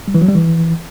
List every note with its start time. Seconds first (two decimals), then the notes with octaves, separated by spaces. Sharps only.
0.08 G3
0.15 E3
0.21 F#3
0.28 G3
0.35 E3